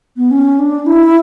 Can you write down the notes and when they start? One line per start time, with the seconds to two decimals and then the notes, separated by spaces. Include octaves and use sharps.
0.17 B3
0.31 C#4
0.59 D4
0.86 E4